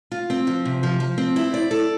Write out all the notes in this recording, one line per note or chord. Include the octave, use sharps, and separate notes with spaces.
F4
C4
F3
C3
F3
F3
C4
E4
D5
A4